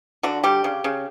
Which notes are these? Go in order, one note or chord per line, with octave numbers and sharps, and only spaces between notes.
D3 F#4
G3 G4
C#3
C#3